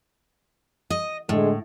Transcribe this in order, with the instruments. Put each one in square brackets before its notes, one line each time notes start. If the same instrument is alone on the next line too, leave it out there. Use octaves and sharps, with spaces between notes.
[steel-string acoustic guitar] D#5
[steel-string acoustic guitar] A2 [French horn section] D3 G#3